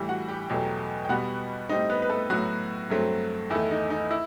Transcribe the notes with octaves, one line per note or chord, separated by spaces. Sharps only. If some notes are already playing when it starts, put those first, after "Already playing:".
Already playing: A2 E3 G3
F#4 F#5
G4 G5
E2 B2 F#3 A3
G5
B2 G3 B3 F#4 F#5
A2 G3 C4 D#4 D#5
B3 B4
B4
A3 A4
A2 F#3 B3 F#4
G2 F#3 A3 C4
E2 D#3 A3 E4
D#4
D#4
E4